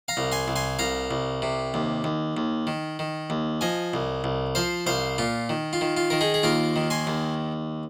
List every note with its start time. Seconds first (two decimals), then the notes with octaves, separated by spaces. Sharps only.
0.08 F5 A#5
0.17 C2
0.32 G#5 C6
0.48 C2
0.56 G#5 C6
0.79 C2 F5 A#5
1.11 C2
1.42 C3
1.74 D#2
2.04 D#2
2.37 D#2
2.67 D#3
2.99 D#3
3.30 D#2
3.61 F3 D#5 G#5
3.94 C2
4.24 C2
4.55 F3 C5 F5
4.86 C2 C5 F5
5.18 A#2 F4
5.49 D#3
5.73 F4
5.81 D#3
5.97 F4
6.10 D#3 A#4
6.21 D#4 G#4
6.34 G#4
6.43 D#2 F4 A#4
6.76 D#3
6.90 G#5 C6
7.07 D#2